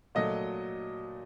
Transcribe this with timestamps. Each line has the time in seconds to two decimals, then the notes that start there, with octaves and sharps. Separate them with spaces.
0.15 A#2 F#3 A3 D#5